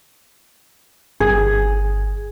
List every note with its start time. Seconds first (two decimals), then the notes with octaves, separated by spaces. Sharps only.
1.20 G1 G#4